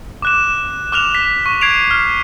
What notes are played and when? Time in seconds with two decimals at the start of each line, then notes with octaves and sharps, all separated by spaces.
0.22 D6 F#6 E7
0.92 D6 F6 F#6 E7 F7
1.15 B6
1.46 C#6
1.61 G#6 C7 D7 F7
1.91 F6